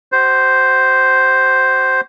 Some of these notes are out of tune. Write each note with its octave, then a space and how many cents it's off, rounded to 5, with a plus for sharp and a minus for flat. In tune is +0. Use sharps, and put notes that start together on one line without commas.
F#4 +35 C5 +0